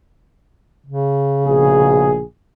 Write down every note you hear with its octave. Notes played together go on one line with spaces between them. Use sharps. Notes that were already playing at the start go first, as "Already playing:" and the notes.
C#3
A#1 B2 G#4